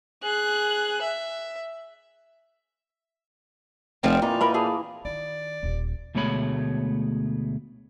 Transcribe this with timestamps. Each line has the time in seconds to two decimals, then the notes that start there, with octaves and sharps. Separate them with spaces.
0.23 G#4 F#6
1.01 E5
4.03 F1 F3 G3 C4
4.22 A#2 E3 A#3 D#4 F4
4.41 E3 A#4 B5
4.54 G#4 A4
5.05 D#3 D5
5.63 D#1
6.15 D2 B2 G#3 A3 C#5 B5